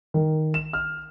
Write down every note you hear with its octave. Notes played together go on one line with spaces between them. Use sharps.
D#3
E7
F6